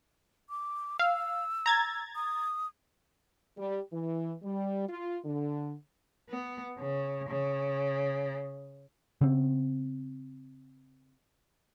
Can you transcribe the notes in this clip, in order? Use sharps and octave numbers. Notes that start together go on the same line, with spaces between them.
D6
F5 E6
A#5 G#6 A6
D#6
G3
E3
G3
F4
D3
B3
C#3
C#3
C#3 B3 C4